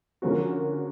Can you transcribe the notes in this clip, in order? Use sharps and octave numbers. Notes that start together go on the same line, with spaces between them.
D3 F3 A#3 C#4 F#4